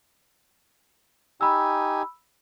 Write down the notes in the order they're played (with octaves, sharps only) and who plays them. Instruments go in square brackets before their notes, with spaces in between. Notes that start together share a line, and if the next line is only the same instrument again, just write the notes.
[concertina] D#4 G4 G#5 [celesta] B5 E6